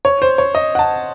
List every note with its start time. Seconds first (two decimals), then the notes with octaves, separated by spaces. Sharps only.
0.05 C#5
0.22 C5
0.38 C#5
0.55 D#5
0.75 F#5
0.79 A5